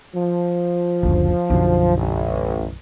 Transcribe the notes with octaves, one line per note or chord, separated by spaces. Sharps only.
F3
F#1 D2
B1 F#2 D3
A1